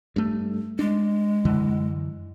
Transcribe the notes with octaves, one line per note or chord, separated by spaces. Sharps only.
G2 A3
G#3 D4
F#2 D3 E3